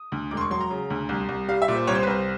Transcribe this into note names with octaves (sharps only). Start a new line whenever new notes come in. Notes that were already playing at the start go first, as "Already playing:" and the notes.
Already playing: D#6
D2
E1 D6
C6
C#6
F#3 C6
A#5
C#3
D2
C2
C2
G3 F5
E5
A#2
C5
C2 C#5
C5
B4
C2 C5